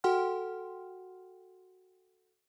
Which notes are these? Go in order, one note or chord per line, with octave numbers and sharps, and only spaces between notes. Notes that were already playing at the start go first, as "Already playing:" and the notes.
F#4 A4 F#5 G5 C6 F6